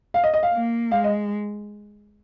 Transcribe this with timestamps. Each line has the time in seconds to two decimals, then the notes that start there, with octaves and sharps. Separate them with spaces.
0.14 F5
0.24 D#5
0.34 D#5
0.43 F5
0.52 A#3
0.91 G#3 F5
1.04 D#5